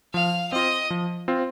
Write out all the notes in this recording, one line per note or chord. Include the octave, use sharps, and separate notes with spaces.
F3 F5
C4 F4 D#5
F3
C4 F4